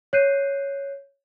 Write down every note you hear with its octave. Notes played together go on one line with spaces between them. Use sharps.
C#5 F#6 G6 C7 D#7